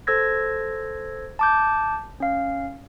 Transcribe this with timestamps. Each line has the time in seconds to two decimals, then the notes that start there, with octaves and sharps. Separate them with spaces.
0.07 A4 C5 E6 G#6 A#6
1.39 A5 D6 G6
2.20 C#4 F5